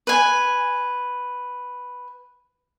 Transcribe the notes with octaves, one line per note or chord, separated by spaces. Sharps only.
B4 G#5